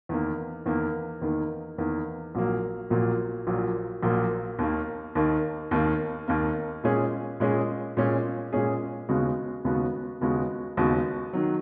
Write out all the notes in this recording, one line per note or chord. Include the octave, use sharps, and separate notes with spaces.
E2 D#3 A#3
E2 D#3 A#3
E2 D#3 A#3
E2 D#3 A#3
A#1 A#2 F#3 A#3
A#1 A#2 F#3 A#3
A#1 A#2 F#3 A#3
A#1 A#2 F#3 A#3
D#2 D#3 A#3
D#2 D#3 A#3
D#2 D#3 A#3
D#2 D#3 A#3
A#2 G#3 C#4 G#4
A#2 G#3 C#4 G#4
A#2 G#3 C#4 G#4
A#2 G#3 C#4 G#4
D#2 C#3 G#3 B3 F#4
D#2 C#3 G#3 B3 F#4
D#2 C#3 G#3 B3 F#4
D#2 C#3 G#3 B3 F#4
D#3 F#3